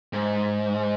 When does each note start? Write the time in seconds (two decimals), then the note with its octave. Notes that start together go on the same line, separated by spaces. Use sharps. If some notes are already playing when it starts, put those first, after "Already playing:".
0.13 G#2